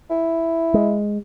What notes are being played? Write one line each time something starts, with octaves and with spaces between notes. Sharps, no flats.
E4
G#3